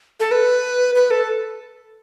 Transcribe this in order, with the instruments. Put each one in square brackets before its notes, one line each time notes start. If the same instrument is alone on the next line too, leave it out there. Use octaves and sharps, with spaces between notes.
[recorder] A4
B4
B4
A4